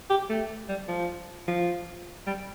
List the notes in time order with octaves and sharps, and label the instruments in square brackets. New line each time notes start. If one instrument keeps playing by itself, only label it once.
[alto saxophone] G4
A3
G3
F3
F3
G3